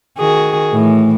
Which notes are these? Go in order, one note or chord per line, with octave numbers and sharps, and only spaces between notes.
D#3 F#4 G#4
A2 E3